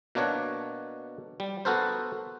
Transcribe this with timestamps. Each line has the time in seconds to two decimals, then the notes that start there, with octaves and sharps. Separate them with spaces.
0.15 B2 A#3 D4 C#5 F#5
1.40 G3
1.65 B3 F#4 A4 A#4 C5